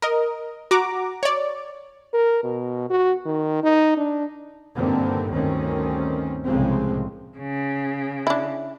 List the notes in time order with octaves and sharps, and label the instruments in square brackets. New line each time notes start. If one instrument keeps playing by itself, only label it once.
[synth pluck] A#4 D#5
F#4 A#5 D6
C#5 D5
[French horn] A#4
B2
F#4
D#3
D#4
D4
[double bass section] G2 A#2 D3 D#3 C4
D2 G2 D#3 C4 C#4
C2 A2 C#3 F3 G#3 C4
[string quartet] C#3
[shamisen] D4 E4